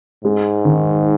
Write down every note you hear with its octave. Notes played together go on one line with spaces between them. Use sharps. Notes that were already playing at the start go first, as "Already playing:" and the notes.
G#2 G#3
D#3